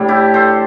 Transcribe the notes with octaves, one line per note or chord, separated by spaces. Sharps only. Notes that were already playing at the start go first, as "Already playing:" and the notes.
Already playing: A2 G3 D4
E4 G4
A4 C5